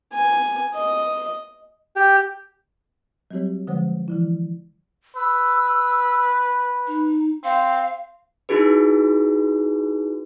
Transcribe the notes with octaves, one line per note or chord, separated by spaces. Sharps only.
G#5
D#5
G4
F#3 G3 C4 F#4 G4 C#5
D3 F3 G#3 C5 C#5 F#5
E3 F3 E4
B4 E6
D#4
C4 F5
D#4 E4 F#4 G#4 B4